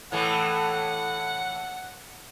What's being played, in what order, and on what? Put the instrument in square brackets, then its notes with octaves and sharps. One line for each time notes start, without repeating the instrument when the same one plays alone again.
[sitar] A2 E3 A3 [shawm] F#5